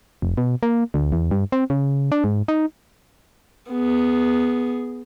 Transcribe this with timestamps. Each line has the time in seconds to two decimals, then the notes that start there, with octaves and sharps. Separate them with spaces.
0.22 F1
0.38 B2
0.63 A#3
0.94 D2
1.12 E2
1.31 G2
1.52 C4
1.70 C#3
2.12 D4
2.24 G#2
2.48 D#4
3.71 B3 G#4